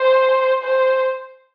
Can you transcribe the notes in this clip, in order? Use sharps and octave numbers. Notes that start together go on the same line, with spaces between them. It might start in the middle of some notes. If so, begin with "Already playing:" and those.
Already playing: C5
C5